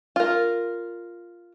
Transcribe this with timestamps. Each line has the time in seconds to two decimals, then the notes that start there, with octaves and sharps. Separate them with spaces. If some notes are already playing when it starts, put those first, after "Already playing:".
0.16 F4 A#4